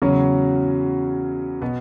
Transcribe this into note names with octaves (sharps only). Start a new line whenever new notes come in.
E2 C#3 F#3 C#4 F#4
B2 B3